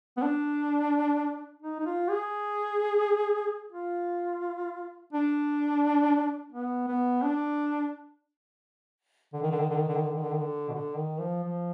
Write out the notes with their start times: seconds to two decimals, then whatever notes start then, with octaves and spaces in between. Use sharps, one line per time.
0.17 B3
0.22 D4
1.62 D#4
1.80 D#4
1.86 F4
2.09 G#4
3.72 F4
5.13 D4
6.53 B3
6.88 B3
7.23 D4
9.33 D3
9.43 D#3
9.51 D3
9.60 D#3
9.70 D3
9.78 D#3
9.88 D3
9.96 D#3
10.05 D3
10.15 D#3
10.23 D3
10.33 D#3
10.41 D3
10.69 B2
10.74 D3
10.97 D#3
11.21 F3
11.43 F3